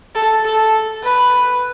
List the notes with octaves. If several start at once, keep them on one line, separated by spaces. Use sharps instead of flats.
A4
A4
B4